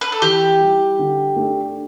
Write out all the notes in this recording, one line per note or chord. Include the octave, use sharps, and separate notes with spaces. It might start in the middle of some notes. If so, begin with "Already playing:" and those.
B4
A4
E3 G4
G3 E4
D3
A3 D4 A4